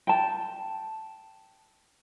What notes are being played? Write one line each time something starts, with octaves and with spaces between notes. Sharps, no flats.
G5 A5